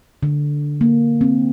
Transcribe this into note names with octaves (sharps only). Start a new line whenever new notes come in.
D3
A#3
C4